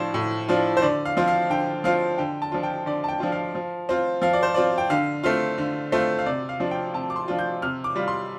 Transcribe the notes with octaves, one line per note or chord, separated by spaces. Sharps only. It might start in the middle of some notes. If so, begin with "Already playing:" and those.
Already playing: A2 F3 D4 F4 C5
A2
F3 D4 F4
C5
D3 D5
F5
F3 C4 F4
F5
D3 G5
F3 C4 F4 F5
D3 G5
A5
F3 D4 F4
G5
D3 D5
A5
G5
F3 D4 F4
F5
F3
C4 F4
F3 F5
D5
C5
C4 F4 D5
G5
D3 F5
A3 C4 F4 F5
D3
A3 C4 F4
F5
C3 D5
F5
F3 D4 F4
G5
C3 A5
D6
C6
F3 D4 F4
G6
C3 F6
D6
G3 F4
C6